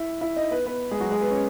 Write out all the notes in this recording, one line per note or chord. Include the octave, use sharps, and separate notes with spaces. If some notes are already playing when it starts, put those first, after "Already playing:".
Already playing: E4 E5
E4 E5
D#4 D#5
B3 B4
B3 B4
G#3 G#4
F#3 F#4
G#3 G#4
B3 B4
C#4 C#5